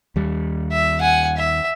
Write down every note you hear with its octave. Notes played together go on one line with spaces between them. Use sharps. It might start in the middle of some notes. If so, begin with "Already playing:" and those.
D#2 G3
E5
F#5 G#5
E5